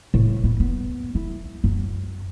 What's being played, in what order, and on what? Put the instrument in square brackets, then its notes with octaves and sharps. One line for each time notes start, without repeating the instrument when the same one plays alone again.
[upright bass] A2
B3
B3
E4
F#2